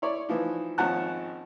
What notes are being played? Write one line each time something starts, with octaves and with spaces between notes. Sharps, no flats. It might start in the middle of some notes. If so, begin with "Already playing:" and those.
E4 C#5 D5
E3 F3 D#4
G#1 F3 C#4 F#5 A5 F#6